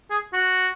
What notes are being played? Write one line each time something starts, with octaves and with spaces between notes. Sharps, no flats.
G#4
F#4